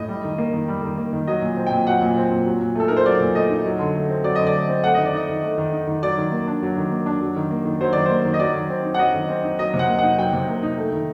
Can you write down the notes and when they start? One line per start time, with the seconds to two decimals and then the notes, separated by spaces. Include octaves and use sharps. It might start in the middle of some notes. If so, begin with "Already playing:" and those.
Already playing: A2 D#5
0.09 G3
0.24 D#3
0.38 A#3
0.53 D#3
0.68 G3
0.82 D#3
0.98 A#3
1.13 D#3
1.27 F#3 D#5
1.42 A#2
1.57 C4
1.66 G5
1.72 A#2
1.87 F#3 F#5
2.02 A#2
2.17 C4
2.32 A#2
2.46 F#3
2.61 A#2
2.75 A3 A4
2.88 D#4 A#4
2.97 C5
3.05 F#3 D5
3.20 A#2
3.35 A3 D#5
3.50 D#4
3.65 F#3
3.79 D3
3.95 A3
4.09 C4
4.24 F#3 D5
4.35 D3 D#5
4.47 D5
4.54 A3
4.69 C4
4.83 A3 F#5
4.95 D#3 D#5
5.06 D5
5.13 D#4 D#5
5.28 D#3
5.43 A3
5.58 D#3
5.73 D#4
5.87 D#3
6.02 F#3 D5
6.18 D#3
6.32 A#3
6.47 D4
6.62 F#3
6.77 D#3
6.91 A#3
7.06 D4
7.21 F#3
7.36 D#3
7.51 A#3
7.65 D#3
7.81 F#3 C5
7.93 D#3 D5
8.05 A#3 C5
8.25 D#3
8.34 D#5
8.40 F#3 D5
8.55 D#3
8.70 C4
8.85 D#4
8.94 F#5
8.99 F#3 D#5
9.14 D#3
9.29 C4
9.44 D#4
9.59 F#3 D#5
9.74 C3
9.79 F#5
9.88 A#3
9.98 D#4 F#5
10.18 F#3 G5
10.33 C3
10.48 A#3
10.63 D#4
10.78 A3
10.92 D#3